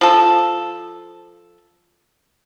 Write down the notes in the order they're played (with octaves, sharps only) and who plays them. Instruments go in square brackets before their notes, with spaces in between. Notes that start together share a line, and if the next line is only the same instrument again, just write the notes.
[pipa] F3 A4